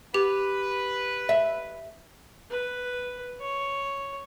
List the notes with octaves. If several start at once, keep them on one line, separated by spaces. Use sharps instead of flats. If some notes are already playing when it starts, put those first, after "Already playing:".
G4 B4
E5
B4
C#5